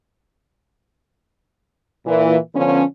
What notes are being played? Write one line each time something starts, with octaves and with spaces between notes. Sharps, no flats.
A#2 E3
D3 F3 B3 C#4